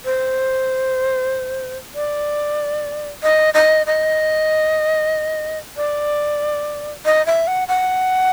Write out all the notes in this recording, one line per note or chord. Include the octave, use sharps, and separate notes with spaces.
C5
D5
D#5
D#5
D#5
D5
D#5
E5
F#5
F#5